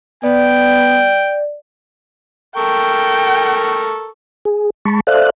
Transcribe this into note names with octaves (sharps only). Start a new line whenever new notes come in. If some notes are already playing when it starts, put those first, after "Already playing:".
B3 D5 G5
A4 A#4 G5 C#6
G#4
G#3 A5 B5 C#6
A4 C5 D5 E5 F5 F#6